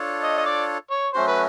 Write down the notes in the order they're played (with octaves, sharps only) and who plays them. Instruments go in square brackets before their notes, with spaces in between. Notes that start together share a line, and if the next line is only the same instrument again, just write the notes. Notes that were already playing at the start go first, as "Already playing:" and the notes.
Already playing: [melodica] D4 F4 A4 C#5
[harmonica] D#5
D#5
D5
C#5
[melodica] F#3 A3 C#4 F#4 [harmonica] C5
[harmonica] B4